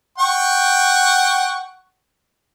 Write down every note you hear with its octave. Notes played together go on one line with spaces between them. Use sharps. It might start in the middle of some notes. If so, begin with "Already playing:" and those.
F#5 G5 C#6